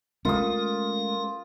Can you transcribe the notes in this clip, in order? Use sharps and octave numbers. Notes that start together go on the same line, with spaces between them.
G#3 A3 C#4 F4 A#4 D#6